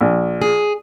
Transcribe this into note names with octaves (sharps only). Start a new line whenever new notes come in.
A#1
G#4